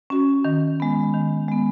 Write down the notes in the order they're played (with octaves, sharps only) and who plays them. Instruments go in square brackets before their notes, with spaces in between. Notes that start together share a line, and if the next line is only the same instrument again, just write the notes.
[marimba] C#4 F#4
D#3
G#3 B3
D#3
G#3 B3